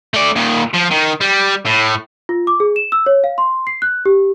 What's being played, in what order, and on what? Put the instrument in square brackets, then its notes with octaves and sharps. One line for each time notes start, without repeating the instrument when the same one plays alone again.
[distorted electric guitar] A3 D5
A#2 D#3
F3
D#3
G3
A2
[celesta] F4
D6
G#4
E7
E6
C#5
F5
C6
C7
F#6
G4